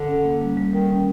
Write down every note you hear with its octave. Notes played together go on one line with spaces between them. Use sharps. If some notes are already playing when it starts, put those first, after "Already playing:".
Already playing: D3
C#4
A#3
G3
G3
D#3 G3
C#4